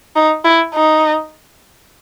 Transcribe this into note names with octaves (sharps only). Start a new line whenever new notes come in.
D#4
E4
D#4